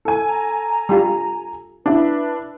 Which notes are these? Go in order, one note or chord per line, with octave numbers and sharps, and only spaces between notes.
A4 G#5
A#5
G3 F4
D4 E4 B4